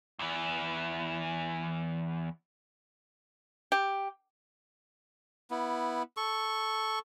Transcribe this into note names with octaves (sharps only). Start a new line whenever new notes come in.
E2 E3
G4
B3 E4
A4 C#6